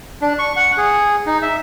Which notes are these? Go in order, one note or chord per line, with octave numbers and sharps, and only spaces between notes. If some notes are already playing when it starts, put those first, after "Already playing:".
D4
C#6
F#5
G#4
D#4
E5